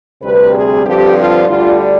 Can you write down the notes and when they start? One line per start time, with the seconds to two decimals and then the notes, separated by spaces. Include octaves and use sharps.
0.21 D2 C3 G3 C4 B4
0.53 G#4
0.84 G2 D3 F3 C4 G4
1.16 F4
1.47 D2 D3 G3 F4